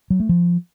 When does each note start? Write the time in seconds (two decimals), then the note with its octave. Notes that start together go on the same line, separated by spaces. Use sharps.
0.10 F#3
0.20 A3
0.29 F3